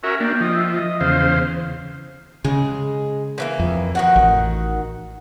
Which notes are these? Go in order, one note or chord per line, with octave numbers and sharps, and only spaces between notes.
C#4 F#4 A#4 E5
A#3 D4 G5
F3 D#5
E5
D#5
E2 C#3 C5 F5
C#3 G#3
D3 E3 A#3
F2
D#3 F#4 F#5
A1